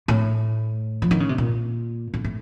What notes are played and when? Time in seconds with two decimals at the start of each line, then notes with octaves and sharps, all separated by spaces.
0.08 A2
1.02 F3
1.11 D#3
1.20 C#3
1.29 C3
1.38 A#2
2.14 A2
2.24 A2